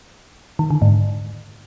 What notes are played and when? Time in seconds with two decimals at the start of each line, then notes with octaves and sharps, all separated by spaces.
0.59 D#3
0.70 D3
0.82 G#2